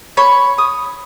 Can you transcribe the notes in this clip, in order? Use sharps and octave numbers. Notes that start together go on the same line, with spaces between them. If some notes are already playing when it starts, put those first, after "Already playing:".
C#5 B5
D#6